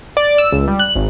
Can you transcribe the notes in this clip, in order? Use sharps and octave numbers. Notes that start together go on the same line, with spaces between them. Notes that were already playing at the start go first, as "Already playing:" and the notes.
D5
E6
C#2
G3
F#6
G#1